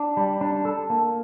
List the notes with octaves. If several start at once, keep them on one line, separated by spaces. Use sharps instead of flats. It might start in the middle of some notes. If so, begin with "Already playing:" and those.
Already playing: D4
G3
D4
A4
A#3